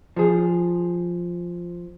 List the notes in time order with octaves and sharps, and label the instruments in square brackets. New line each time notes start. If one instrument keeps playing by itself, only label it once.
[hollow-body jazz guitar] F3 G#4